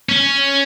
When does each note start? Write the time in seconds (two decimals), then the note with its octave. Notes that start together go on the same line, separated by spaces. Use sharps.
0.09 C#4